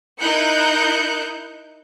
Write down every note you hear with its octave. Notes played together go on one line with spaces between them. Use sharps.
D#4 E4 A#4 F#6 G6 C#7